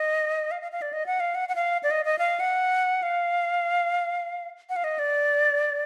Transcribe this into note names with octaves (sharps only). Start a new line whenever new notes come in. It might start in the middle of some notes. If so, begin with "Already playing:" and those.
Already playing: D#5
F5
F5
F5
D5
D#5
F#5
F5
F#5
F#5
F5
D5
D#5
D#5
F5
F#5
F5
F#5
F5
D#5
D5